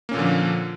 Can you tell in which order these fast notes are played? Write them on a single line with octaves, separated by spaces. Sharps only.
A#3 C#4 A#2 D3 F3